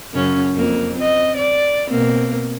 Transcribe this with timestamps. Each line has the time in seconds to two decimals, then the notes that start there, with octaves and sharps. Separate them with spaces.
0.14 F#2 C#3 C#4
0.56 F2 A#3
0.98 C4 D#5
1.37 D5
1.89 B2 A#3 C4